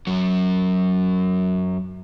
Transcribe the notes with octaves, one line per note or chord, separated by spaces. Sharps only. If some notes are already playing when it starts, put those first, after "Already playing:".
F#2 F#3